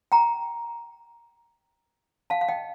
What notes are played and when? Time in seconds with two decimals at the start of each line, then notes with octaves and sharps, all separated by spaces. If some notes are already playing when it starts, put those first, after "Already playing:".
0.12 G5 A#5
2.30 F5 A5
2.41 F5
2.49 D#5 G5